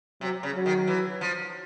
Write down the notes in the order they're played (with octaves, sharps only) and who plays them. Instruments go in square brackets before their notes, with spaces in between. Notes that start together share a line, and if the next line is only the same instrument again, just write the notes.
[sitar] C3 [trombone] F#3
[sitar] C#3
[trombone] F#3
[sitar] D#3
E3
F3